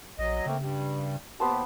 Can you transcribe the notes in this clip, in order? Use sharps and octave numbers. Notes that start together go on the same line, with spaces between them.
A#1 F#3 D#5
C#3 A3 A#3 C4
G2 G3
D#2 A#2 B3 G4 C5 A5